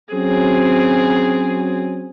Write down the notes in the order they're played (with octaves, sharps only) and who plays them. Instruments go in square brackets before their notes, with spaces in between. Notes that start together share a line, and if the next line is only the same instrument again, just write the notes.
[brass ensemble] F#3 C#4 [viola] C4 G#4